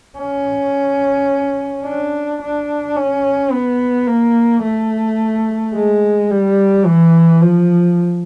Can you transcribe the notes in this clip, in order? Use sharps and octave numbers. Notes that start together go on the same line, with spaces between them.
C#4
D4
D4
C#4
B3
A#3
A3
G#3
G3
E3
F3